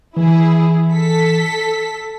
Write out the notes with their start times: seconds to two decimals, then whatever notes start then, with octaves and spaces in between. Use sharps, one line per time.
0.17 E3 E4 G#4
0.92 A4 B6